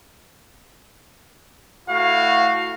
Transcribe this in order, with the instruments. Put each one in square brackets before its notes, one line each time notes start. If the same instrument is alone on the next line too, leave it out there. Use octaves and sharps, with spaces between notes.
[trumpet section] A3 E4 F#4 F5